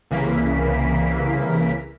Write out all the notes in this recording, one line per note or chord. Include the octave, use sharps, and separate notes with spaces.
C2 C#3 E3 A#3 B6